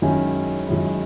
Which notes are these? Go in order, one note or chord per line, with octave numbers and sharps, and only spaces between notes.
F#2 D#3 G#3 C#4 E4
F#2 D#3 G#3 C#4 E4